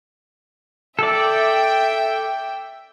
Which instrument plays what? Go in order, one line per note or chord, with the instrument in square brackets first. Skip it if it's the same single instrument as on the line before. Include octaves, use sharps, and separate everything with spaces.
[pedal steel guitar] A4 D5 [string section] E5 G5